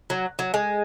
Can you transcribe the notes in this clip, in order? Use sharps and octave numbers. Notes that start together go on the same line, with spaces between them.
F#3
F#3
G#3